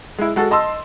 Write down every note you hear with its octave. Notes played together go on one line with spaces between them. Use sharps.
G#3 E4
G#3 F#4 A4
D#5 A5 C6 E6